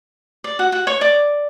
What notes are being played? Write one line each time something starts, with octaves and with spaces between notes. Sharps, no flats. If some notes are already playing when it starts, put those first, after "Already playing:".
D5
F#4 F#5
F#4 F#5
C#5 C#6
D5 D6